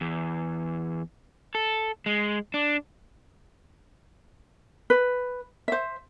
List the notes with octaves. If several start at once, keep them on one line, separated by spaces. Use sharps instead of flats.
E2
A4
G#3
D4
B4
C5 E5